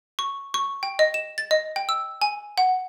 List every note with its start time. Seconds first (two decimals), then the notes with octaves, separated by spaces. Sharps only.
0.19 C#6
0.54 C#6
0.83 G5
0.99 D#5
1.14 E7
1.38 A6
1.51 D#5
1.76 G5
1.89 E6
2.21 G#5
2.58 F#5